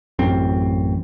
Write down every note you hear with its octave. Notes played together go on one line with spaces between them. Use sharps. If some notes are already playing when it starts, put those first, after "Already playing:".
A1 F#2 C4